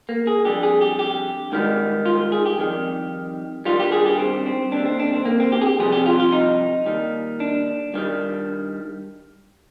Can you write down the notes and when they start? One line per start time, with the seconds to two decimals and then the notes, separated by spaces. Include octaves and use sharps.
0.09 A#3
0.27 G#4
0.45 F2 D3 G3 G4
0.63 G#4
0.81 G4
0.99 G4
1.52 G#2 D#3 G3
2.06 F4
2.32 G#4
2.46 G4
2.58 F2 D#3 G3
3.65 G2 D#3 G3 F4
3.80 G4
3.92 G#4
4.06 G4
4.19 C4
4.46 C4
4.72 D#2 D3 G3 D4
4.85 C4
5.00 D4
5.13 C4
5.25 A#3
5.40 C4
5.52 G4
5.62 G#4
5.66 G4
5.79 F2 C3 G3 G#4
5.92 G4
6.06 F4
6.20 F4
6.32 D#4
6.86 D#2 D#3 G3
7.40 D4
7.94 G2 D#3 G3